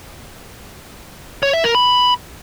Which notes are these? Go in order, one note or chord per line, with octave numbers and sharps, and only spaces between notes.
C#5
E5
A#4
B5